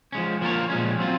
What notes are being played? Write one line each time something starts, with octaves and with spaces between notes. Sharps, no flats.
F3 G#3 C#4
F3 A#3 F4 A#4 C#5
A#2 F3 G#3 C#4
F#3 C4 F4